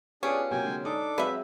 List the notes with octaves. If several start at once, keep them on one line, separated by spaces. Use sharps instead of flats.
B3 C#4 D4 F4 G4 G#4 D7
C3 F#3 A#3 G5 G#5
D3 G#3
D4 D#4 A4 D6 D#6
F#3 G#3 C4 B4 E5 F5